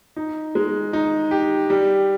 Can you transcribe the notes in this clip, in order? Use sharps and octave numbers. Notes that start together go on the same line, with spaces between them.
D#4
G#3
D#4
G4
G3